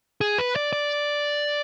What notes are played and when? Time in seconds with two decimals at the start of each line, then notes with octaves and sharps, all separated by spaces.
0.21 G#4
0.38 B4
0.56 D5
0.73 D5